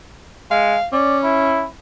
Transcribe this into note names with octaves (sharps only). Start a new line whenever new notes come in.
G#3 F5
C#4 D5
E4